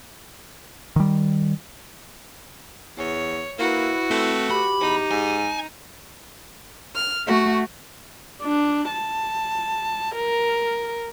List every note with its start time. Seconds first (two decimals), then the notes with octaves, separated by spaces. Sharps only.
0.96 D#3 G3
2.98 E2 C#5
3.59 A#3 E4 F#4 B4
4.11 A3 C4
4.50 G4 B5
4.81 E2 D#4
5.11 G#2 G#5
6.95 F6
7.26 A3 F#4
8.43 D4
8.92 A5
10.15 A#4